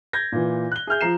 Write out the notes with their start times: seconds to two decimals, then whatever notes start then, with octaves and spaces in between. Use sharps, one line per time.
0.13 G6 G#6 A#6
0.32 A#2 E3
0.72 F#6 G7
0.87 G#4 E5 F6 G6
1.01 F3 A#5 C7 E7